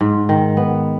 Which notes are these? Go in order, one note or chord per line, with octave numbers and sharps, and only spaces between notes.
G#2
D#3
B3